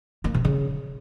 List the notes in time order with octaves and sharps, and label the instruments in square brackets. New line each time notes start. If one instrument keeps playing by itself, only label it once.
[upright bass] A#3
C3
C#3